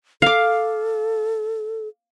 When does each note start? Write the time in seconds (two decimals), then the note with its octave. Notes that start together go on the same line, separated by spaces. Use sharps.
0.22 A4 F5 D6